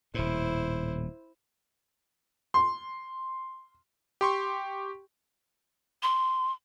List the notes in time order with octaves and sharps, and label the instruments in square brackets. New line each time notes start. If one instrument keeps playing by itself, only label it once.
[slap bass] D#1 A2 [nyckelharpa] E4 C5
[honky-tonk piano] C6
[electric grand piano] G4 C6 C#6
[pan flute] C6